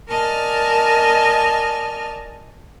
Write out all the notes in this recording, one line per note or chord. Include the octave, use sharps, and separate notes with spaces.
A#4 D5 D#5 G#5 A5 F6